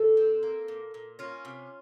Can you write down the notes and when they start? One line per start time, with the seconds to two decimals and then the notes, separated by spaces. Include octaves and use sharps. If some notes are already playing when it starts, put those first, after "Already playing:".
Already playing: C3 A3 A4
0.17 C4
0.43 A#3
0.68 A#2
0.94 A#2
1.19 A#3 C#4 F4
1.45 C3